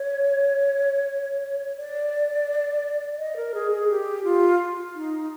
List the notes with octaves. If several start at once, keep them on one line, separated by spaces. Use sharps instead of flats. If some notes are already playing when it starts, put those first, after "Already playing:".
Already playing: C#5
D5
D#5
A#4
G#4
G#4
G4
F4
D#4